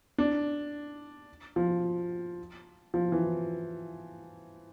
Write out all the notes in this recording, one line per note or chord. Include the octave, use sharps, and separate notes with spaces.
D4
F3
F3
E3